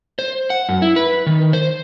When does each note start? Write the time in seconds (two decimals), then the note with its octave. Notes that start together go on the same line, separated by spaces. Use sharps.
0.19 C5
0.50 F#5
0.69 F#2
0.82 E4
0.96 B4
1.26 D#3
1.53 C5